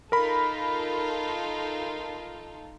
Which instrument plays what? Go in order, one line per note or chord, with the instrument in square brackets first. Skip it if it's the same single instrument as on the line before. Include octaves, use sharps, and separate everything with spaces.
[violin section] D#4 F4 A4 [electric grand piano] A#4 B5